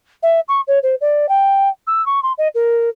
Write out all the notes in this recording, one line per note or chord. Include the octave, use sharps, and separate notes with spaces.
E5
C#6
C#5
C5
D5
G5
E6
C#6
C6
D#5
A#4